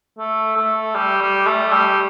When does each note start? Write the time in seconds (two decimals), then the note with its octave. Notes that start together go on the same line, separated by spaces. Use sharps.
0.19 A3
0.57 A3
0.95 G3
1.21 G3
1.47 A3
1.72 G3